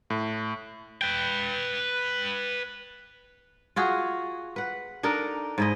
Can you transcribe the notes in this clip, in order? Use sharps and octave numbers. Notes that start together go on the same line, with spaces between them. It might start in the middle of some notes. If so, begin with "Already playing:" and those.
A2
B4 G5
F4 F#4 G#4 F5
B4 F#5
D4 D#4 A4 A#4
G#2 E4 D#5